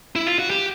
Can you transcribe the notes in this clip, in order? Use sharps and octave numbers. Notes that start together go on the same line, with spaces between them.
E4
F4
F#4
G4